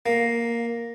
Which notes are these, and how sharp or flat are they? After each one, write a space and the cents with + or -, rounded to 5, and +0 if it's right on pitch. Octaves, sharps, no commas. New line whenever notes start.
A#3 +0